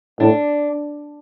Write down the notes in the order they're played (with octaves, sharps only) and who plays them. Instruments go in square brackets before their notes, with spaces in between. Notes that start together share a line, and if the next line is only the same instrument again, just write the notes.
[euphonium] A2 [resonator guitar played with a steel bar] D4